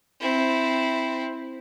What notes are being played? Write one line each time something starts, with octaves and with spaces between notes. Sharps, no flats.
C4 E4